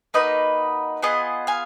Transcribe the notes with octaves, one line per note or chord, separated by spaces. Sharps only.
A#3 D#4 F#4 B4 D#5
B3 F4 G#4 D#5 F#5
F5 G#5